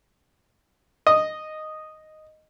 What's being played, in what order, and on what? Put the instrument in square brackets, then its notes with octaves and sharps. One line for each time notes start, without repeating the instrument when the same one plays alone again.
[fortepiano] D#5